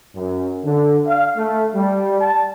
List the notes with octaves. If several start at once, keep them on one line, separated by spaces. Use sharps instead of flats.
F#2
D3
F5
A3
G3
A5